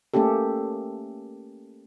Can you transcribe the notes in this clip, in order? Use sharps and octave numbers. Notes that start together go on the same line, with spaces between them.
A3 A#3 C#4 G4 A4